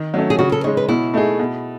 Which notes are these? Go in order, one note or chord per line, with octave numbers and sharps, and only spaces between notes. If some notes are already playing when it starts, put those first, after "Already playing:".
Already playing: D#3
F#3 A3 C#4
G#4
C#3 F#4
A4
G#3 D#4 C#5
B4
B2 E4
A3 D#4 G#4
B2